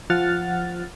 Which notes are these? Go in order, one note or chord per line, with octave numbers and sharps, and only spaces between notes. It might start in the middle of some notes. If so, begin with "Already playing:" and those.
F3 F#5 F6 A6